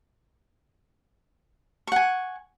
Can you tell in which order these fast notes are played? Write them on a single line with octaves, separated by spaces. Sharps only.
C#6 F#5 G#5